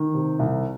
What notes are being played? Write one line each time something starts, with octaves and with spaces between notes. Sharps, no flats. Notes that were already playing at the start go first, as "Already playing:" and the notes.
Already playing: D#3
C3
C2